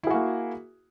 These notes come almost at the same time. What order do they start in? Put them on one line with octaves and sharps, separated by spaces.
E4 G#4 F#4 A#3